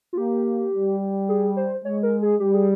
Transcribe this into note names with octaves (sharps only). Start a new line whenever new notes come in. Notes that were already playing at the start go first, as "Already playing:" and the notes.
F4
A#3 G4
G3
G#4
C5
G#3 C#5
A#4
G#4
G3 G4
G#4